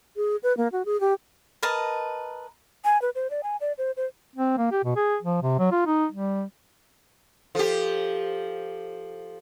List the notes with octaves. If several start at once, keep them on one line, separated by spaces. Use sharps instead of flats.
G#4
B4
A#3
F#4
G#4
G4
A#4 B4 D#5 A5
G#5
B4
C5
D5
G#5
D5
C5
C5
C4
A#3
G4
B2
G#4
F3
C3
F#3
F4
D#4
G3
F3 G4 A4